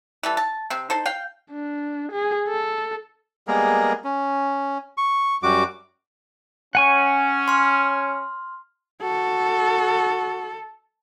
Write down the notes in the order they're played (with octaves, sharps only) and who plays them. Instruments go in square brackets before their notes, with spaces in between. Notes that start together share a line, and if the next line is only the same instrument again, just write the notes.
[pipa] E3 G3 A4
A5
C3 C4
D#4 A4 C5
F5 G5
[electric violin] D4
G#4
A4
[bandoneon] G3 G#3 A#3 B3 G#4 A#4
C#4
C#6
F#2 G3 F#4 D6
[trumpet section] C#4 [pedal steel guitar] F#5 G#5 C#6
[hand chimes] C6 F6
[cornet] F#4 [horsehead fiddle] A4